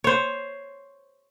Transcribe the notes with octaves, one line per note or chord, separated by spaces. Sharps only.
C5 C#5